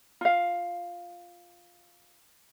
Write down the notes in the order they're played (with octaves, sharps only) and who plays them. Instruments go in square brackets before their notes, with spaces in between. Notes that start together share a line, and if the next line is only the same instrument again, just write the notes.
[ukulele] F4 F5